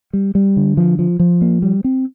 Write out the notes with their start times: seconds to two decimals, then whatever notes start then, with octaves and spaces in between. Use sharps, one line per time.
0.13 G3
0.35 G3
0.57 D3
0.77 F3
0.99 F3
1.19 F3
1.41 A#3
1.62 G3
1.84 C4